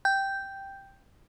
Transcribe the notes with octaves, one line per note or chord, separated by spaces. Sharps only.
G5 G6